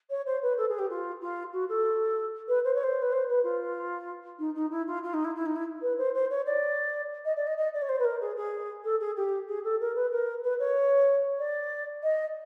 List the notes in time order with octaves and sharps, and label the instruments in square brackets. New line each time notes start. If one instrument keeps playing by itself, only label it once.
[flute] C#5
C5
B4
A4
G#4
G4
F4
F4
F#4
A4
B4
C5
C#5
C5
B4
C5
B4
F4
D#4
D#4
E4
F4
F4
D#4
E4
E4
D#4
E4
B4
C5
C5
C#5
D5
D#5
D5
D#5
D#5
D5
C#5
C5
B4
A#4
G#4
G#4
A4
G#4
G4
G#4
A4
A#4
B4
A#4
B4
C#5
D5
D#5